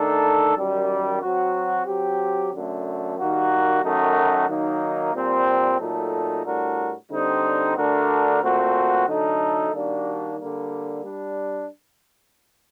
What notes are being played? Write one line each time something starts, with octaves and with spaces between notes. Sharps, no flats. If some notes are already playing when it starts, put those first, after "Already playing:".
Already playing: D#3 A3 D4 A4
F#2 D#3 G3
F#3 C4 F#4
F#3 C4 G4
F#2 D3 A3
D#3 G3 A#3 F#4
F#2 D#3 A3 D#4 F#4
D#3 F#3 A#3 D#4
A#2 G3 C4
A#2 F#3 A3 D#4 A4
A2 G3 D4 F#4 A#4
D3 G3 C4 D#4
D3 A3 D4 F#4 A#4
A#2 A3 C4 F#4
D3 F#3 A3 D#4 A4
D#3 G3 A#3 D4 F#4
D3 G3 A#3
G3 D4